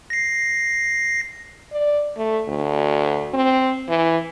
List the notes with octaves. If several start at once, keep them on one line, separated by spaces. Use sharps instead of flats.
A#6 C7
D5
A3
D2
C4
E3